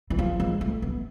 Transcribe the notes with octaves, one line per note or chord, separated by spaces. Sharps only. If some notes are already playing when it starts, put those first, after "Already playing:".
E3
F3
G#3
A3
B3